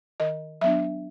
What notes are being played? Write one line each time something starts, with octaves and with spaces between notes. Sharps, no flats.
D#3 D#5
F#3 B3 D4 E5